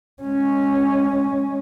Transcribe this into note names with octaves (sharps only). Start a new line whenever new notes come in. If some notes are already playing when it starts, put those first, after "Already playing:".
G#3 C#4